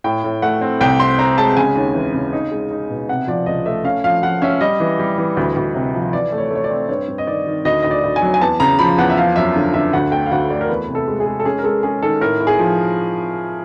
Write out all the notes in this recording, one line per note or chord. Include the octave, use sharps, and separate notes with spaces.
A2 G5
A2
A3 F#5
C4
C2 G5
C4 C6
C4 A#5
G#3 A5
C#3 G#5
D#2
E3
C#3
D#4
G#3
D#4
B2
C3 F#5
F3 D5
C#2 D#5
A3 E5
C#4 F5
F3 F5
F3 F#5
C#4 E5
G3 D#5
E3
G3
E3
D2
D2
C3
F3
E3 D5
A3
C#5
A3 C#5
D5
C4
G2 C#5
G2
D#5
D#3 D5
D#3
D2 D#5
D2 D#5
D5
D2
G#5
F#3
G#5
E2 A5
C#3 A#5
F3 B5
E2 F#5
E5
F3 F5
F#2 E5
D3
D3 E5
D2 F#5
A3 G5
F5
D2 F#5
A3 D5
A#4
E2 B4
C3
A4
G#3
G#4
G#3
A4
C#4 G#4
A#4
G#3 A4
C#4 G#4
D#3 A4
A2 A#4
A2
G#4
F3